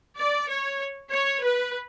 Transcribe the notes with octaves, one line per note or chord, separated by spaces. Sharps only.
D5
C#5
C#5
B4